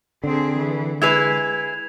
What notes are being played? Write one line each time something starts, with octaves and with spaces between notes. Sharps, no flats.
D3 C4 G#4
E3
G#3 E4 G#4 B4 G#6 F7